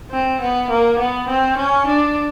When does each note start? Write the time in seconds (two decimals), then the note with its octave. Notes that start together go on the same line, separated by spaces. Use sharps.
0.11 C4
0.41 B3
0.70 A#3
0.99 B3
1.29 C4
1.58 C#4
1.87 D4